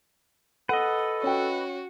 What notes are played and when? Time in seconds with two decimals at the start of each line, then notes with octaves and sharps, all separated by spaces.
0.69 A4 B4 D#5 F#5
1.23 C#4 F#4 G5